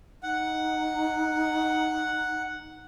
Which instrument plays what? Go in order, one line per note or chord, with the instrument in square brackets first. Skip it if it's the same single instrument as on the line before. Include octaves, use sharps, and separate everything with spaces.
[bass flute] D#4 [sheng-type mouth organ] F#5